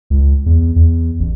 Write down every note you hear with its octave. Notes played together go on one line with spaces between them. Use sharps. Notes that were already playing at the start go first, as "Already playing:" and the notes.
C#2
E2
E2
A1